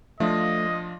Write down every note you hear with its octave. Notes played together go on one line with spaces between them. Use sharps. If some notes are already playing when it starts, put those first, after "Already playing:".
F3 A3 D4 F4 D#5